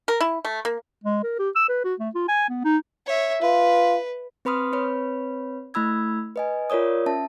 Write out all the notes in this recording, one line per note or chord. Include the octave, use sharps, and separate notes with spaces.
A#4
E4
A3
A#3
G#3
A#4
G4
E6
B4
F#4
A3
F4
G#5
B3
D#4
C#5 E5
F4 B4
C4 B4 B5 C6 D#6 F6
C4 B4 C#5 B5
A3 E4 B5 E6 G#6
B4 D#5 G#5
F4 A#4 C#5 D5 D#6
C#4 E5 A5